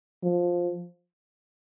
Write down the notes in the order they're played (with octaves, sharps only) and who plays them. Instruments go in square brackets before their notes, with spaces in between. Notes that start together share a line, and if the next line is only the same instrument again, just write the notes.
[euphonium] F3